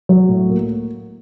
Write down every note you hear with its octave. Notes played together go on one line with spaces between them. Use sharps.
F#3
A2
A#3